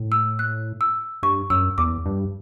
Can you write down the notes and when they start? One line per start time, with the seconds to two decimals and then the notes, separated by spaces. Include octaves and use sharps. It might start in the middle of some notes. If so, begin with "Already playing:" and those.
Already playing: A2
0.12 E6
0.39 F#6
0.81 E6
1.23 G2 C#6
1.50 F#2 E6
1.78 E2 D6
2.06 G2